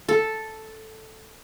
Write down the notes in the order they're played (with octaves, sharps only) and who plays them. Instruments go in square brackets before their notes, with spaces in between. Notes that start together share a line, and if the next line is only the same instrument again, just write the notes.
[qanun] A4